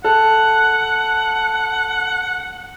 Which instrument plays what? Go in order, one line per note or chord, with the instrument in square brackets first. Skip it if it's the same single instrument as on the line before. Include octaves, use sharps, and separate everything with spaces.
[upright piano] A4 [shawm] F#5